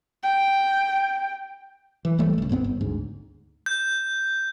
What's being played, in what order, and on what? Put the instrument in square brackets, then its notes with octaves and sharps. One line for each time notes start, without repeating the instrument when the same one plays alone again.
[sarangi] G5
[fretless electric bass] E3
A#1 E3 G3 A3
D#1 C#2
F1 G#2 B3 C4
G1
D2 G#2
[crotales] G6